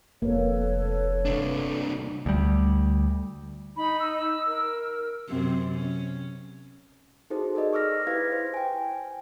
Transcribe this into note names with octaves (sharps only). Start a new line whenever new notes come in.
F1 A#3 A4 B4 C#5
C2 D4
D2 G3
D#4 B5
E6
A#4
F#2 C3 C4
C#4
D#4 F#4 G#4 A4 C5
G#4 A#4 D5 D#5
C#6 D6 E6 F6 A#6
E4 G4 B4 F5 G#6 A#6
C5
G5 G#5